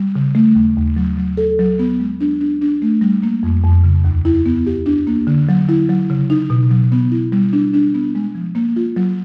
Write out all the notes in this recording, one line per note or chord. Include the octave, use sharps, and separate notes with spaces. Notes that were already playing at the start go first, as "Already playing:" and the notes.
Already playing: G3
C#3
A3
D#2
D#2
F#3
F#3
A4
F#3
B3
G#3
D4
D4
D4
A3
G3
A#3
F2
F2
C#3
D#2
E4
B3
G4
D4
A#3
D3
F#3
E4
F#3
C#3
D#4
B2
F#3
B3
E4
G3
D4
D4
B3
G#3
F3
A#3
F4
F#3